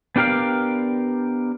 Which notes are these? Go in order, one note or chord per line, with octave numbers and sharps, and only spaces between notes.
B3 D4 G4 A#4 D5 F5